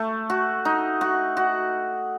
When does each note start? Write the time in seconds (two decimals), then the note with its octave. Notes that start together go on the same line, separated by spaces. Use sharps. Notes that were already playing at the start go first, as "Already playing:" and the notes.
Already playing: A3
0.30 F#4
0.65 D#4
1.01 F#4
1.37 F#4